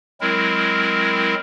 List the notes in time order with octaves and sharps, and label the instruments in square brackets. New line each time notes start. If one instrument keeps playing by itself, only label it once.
[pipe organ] F#3 G#3 C4 E4 A#4